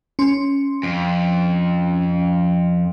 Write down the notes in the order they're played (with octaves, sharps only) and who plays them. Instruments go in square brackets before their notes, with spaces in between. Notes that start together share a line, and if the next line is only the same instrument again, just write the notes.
[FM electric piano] C#4 C6
[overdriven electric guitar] F2